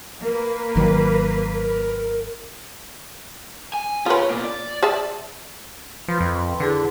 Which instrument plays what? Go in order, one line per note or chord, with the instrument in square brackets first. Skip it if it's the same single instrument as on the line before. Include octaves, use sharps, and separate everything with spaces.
[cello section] A#3 B4 [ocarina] A#4
[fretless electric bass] G#1 D#3 F#3
[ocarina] A#4
[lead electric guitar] G#5
[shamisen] F4 B4 [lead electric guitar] G#4 C#5
[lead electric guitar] B2 A#3
D5
[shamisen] G#4 E5 A5
[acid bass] F3 [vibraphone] B4 B5 C6
[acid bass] F2
[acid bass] D3 [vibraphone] E4 G#4 B4